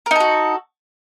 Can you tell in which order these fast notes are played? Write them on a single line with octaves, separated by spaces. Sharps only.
A#4 D#4 A4 F#4